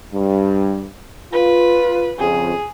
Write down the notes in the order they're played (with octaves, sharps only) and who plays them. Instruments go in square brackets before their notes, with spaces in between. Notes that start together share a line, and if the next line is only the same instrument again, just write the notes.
[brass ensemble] G2
[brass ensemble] F4 [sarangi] B4
[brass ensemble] F2 C#3 [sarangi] G#4